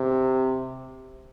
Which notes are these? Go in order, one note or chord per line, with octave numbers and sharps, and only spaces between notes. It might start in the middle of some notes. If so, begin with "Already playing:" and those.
Already playing: C3